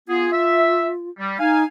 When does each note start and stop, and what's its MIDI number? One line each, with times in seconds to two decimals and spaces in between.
0.08 0.27 59
0.08 1.10 65
0.08 0.27 68
0.32 0.88 76
1.19 1.37 55
1.39 1.64 63
1.39 1.64 77
1.39 1.64 80